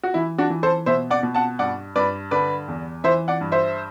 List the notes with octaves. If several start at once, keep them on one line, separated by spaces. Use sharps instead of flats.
F#4
E3 E4
D4 F#4
E3
A4 C5
B2 C5 E5
D5 F#5
B2
F#5 A5
G2 D5 F#5
G2 B4 D5
D3 B4 D5
E2
E3 C5 E5
D5 F#5
G2
C5 E5